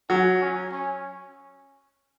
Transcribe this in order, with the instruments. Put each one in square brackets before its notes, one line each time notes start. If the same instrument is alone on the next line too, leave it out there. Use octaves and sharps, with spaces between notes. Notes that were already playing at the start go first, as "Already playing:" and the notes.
[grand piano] F#3 [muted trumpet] C#4
[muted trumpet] C#4
C#4